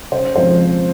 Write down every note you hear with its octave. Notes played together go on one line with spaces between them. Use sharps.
C#3 C5
F3 G#3 C4 C5
C#3